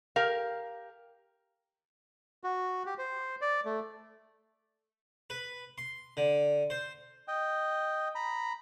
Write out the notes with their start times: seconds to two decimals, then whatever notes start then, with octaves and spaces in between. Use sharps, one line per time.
0.16 G4 A#4 F5
2.44 F#4
2.86 G4
2.98 C5
3.41 D5
3.65 A3
5.30 B4
5.78 C6
6.17 D3
6.70 C5
7.28 D#5 G5
8.15 A#5 B5